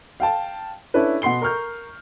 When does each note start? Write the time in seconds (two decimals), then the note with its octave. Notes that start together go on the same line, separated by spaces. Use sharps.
0.20 F5 G5 A5
0.94 C#4 D4 E4 A4 B4
1.22 B2 F#5 C6 C7 G7
1.42 A#4 C#6 F6 G6